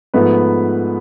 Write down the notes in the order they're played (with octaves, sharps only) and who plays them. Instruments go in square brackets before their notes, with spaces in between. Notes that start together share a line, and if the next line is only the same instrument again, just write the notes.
[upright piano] G#2 F3 A3 B3 B4